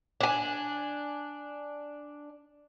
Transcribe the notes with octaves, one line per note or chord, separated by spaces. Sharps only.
D4 G#5